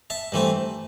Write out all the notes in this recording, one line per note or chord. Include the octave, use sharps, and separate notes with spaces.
E5 A5
G2 E3 A3 C4